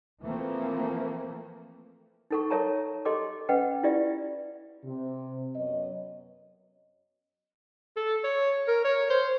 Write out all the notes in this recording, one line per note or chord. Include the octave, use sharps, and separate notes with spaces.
E3 F3 A3 A#3 C4
D#4 A4 C#6
A4 A#4 C#5 E5 A5 A#5
G4 A4 D#5 C6 D6
C#4 B4 D#5 F#5 G5
E4 F4 G4 D5 E5
C3
F#2 F#3 B3 C#5 D#5
A4
C#5
A#4
C#5
C5